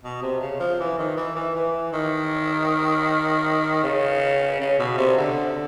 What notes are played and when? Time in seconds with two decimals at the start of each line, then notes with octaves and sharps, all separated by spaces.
0.03 B2
0.22 C3
0.41 C#3
0.60 F3
0.80 E3
0.99 D#3
1.17 E3
1.36 E3
1.56 E3
1.93 D#3
3.83 C#3
4.61 C#3
4.79 B2
4.98 C3
5.18 D3